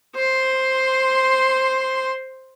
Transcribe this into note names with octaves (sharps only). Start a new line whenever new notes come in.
C5 C6